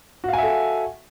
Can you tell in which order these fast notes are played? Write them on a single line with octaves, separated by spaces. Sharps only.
F#4 F5 G#5 E5 A4